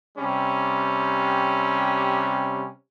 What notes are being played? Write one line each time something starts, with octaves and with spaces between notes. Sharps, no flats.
C3 G3 C#4